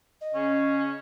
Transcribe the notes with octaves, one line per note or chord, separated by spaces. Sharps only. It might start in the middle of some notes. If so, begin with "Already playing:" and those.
D#5
C#3 C#4